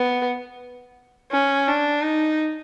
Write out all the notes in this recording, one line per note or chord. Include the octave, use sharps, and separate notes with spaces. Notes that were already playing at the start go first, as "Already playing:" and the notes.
Already playing: B3
C#4
D4
D#4